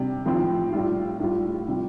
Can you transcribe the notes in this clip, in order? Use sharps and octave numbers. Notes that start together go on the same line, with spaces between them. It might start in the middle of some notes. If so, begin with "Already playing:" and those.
Already playing: C3 G3 D4
A2 F3 C4
A2 G3 F4
A2 G3 F4
C3 G3 F4